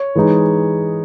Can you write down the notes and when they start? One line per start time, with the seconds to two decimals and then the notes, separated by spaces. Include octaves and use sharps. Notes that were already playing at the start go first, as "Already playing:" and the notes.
Already playing: C#5
0.15 E3 G#3 D#4